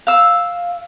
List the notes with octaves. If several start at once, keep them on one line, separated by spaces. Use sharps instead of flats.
F5 E6